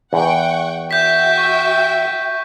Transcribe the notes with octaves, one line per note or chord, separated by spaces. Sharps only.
E2 F#5 G5 C#6
F#4 E5 G5 G6 B6
C#6